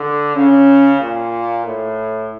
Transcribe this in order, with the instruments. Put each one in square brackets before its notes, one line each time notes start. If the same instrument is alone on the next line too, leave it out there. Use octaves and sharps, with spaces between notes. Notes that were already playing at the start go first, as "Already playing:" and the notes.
Already playing: [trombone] D3
[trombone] C#3 [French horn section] C#4
[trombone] A#2
A2